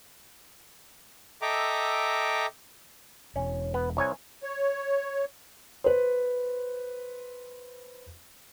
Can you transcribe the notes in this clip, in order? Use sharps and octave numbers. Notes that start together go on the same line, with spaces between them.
A4 D#5 E5 G5 A#5 D6
E1 C#4
B3
C2 C#5 G#5
C#5
B4 C5